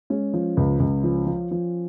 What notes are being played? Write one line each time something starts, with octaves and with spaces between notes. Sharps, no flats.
G#3 C#4
F3
C#2
C#2
F3
F3
F3